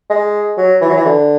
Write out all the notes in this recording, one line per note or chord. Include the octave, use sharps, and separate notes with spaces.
G#3
F#3
E3
F#3
E3
D3